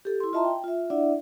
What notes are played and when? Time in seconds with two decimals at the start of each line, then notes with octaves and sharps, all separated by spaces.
0.05 G4 A4
0.20 E4 C6
0.33 F4 D#5 E5 A5 A#5 C6
0.45 G5
0.64 F4 E5
0.90 D4 E4 D5 E5 F#5